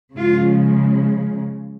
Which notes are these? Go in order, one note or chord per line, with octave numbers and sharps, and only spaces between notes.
C#3 F3 G#3 F4